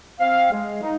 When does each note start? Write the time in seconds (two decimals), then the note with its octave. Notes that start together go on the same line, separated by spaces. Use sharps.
0.20 C4 F5
0.52 G#3
0.82 D#4